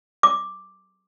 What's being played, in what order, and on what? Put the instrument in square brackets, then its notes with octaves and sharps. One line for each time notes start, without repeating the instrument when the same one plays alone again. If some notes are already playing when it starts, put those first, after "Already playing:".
[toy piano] D6